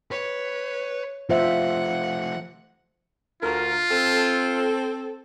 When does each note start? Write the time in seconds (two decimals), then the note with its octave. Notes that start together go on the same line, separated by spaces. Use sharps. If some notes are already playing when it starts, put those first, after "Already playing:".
0.11 B4 C#5
1.29 F3 A3 F4 C5 E5 F#5
3.42 D2 F4 A#4
3.90 C4 A4